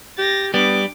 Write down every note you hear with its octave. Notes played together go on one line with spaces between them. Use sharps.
G4 A6 A#6
G3 B3 D4 D6